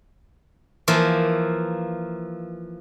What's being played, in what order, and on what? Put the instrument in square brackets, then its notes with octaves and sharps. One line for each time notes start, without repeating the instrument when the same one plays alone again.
[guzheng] E3 F3 A#3 C5